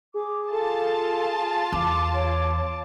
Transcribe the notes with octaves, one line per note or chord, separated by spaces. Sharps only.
G#4 D6
F4 A4 A5
E2 D6
C#5 D6